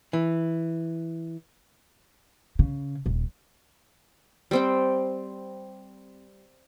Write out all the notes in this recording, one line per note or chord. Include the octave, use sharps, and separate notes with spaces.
E3
C#3
D#1
G3 C4 G5